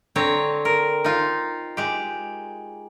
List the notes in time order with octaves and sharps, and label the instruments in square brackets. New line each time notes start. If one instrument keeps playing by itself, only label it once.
[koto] D3 C4 C#5 A#5
A#4
D#4 F4
G#3 G4